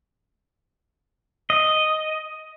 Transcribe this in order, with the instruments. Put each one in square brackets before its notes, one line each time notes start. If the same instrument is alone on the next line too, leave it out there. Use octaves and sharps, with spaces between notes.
[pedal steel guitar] D#5